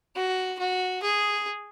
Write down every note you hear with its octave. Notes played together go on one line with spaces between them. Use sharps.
F#4
F#4
G#4